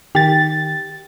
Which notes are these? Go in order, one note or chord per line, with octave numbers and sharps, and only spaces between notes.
D#3 G4 A6